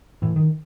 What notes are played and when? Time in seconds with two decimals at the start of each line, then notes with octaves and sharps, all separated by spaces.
0.22 A2 E3
0.36 D#3